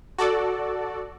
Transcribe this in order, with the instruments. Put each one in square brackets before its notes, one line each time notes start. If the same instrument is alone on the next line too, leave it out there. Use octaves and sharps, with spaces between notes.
[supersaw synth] F#4 A4 D5